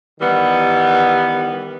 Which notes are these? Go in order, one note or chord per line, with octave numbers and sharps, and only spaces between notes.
D#3 E3 G3 B3